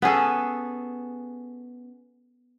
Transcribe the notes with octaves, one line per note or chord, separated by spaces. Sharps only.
B3 C#4 G#4 A4